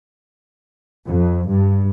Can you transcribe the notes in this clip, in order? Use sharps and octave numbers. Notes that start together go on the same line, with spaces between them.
F2
G2